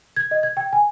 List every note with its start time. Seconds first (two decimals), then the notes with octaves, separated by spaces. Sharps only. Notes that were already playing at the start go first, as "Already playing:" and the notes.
0.16 G#6
0.31 D#5
0.43 G#6
0.57 G5
0.73 G#5